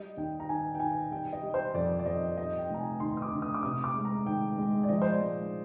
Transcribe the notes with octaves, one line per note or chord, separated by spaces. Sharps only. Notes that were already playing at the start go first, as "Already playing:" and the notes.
Already playing: G3 D#5
D#2 G5
A#5
D#3 G#5
G5
D#3 G#5
G3 G5
D#5
G3
C5
F2 D5
D5
F2 D#5
D5
G3 D#5
G5
F1 A#5
G#5
D#2 C6
D#6
D6
D3
D#6
D6
C3 D#6
D6
G#3
A#5
D#3 G5
G#3
D5
F3 D#5
C5
D5
G#3